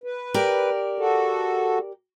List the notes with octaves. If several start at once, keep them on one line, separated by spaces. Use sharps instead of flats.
B4
G4 A#4 D5
F#4 A4